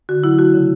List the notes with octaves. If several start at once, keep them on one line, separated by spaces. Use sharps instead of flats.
D3 F#4
F#3 E4
A3 F#4
C#3